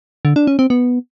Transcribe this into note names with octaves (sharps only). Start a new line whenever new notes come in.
D3
D4
C#4
C4
B3